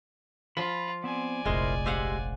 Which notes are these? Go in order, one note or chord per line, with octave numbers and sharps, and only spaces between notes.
F3 F4 B5
B3 C4 D5 G#5
F1 A#1 G#3 E4 A#4 C5
G#3 G4 C5 F5 F#5 E6